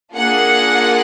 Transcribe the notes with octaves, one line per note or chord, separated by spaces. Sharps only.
A#3 D4 F4 G#4 F#5